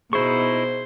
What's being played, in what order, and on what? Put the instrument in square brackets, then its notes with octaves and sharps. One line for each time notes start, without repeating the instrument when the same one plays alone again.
[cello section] B2 [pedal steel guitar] D#4 E4 C#6 [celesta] G#4 [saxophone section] C5